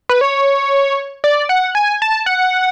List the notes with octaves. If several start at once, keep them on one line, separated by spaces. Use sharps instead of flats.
B4
C#5
D5
F#5
G#5
A5
F#5